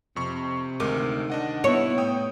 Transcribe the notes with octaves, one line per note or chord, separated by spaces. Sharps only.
F2 C3 C#6
D2 D#3 G#3 D6
D4 D#5 F#5
G3 B3 E4 C#5
A2 G5 D#6